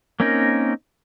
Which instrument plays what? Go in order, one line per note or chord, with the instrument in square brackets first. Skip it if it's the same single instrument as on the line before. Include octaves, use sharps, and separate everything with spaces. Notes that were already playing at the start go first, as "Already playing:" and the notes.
[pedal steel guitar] A#3 C4 C#4 D#4 A#4